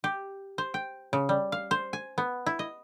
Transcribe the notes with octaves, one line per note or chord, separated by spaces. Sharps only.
G4
C5
G5
C#3
G3
F5
C5
G#5
B3
E4
D#5